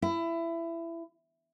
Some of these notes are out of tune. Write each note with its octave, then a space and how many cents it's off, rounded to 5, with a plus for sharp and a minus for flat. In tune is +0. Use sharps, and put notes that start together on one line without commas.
E4 +20